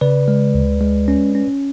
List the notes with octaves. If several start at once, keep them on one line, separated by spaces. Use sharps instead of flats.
C#3 B4 D5
G#3
D2
G#3
C#4
C#4